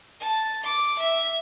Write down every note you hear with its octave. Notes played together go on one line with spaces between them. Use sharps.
A5
D6
E5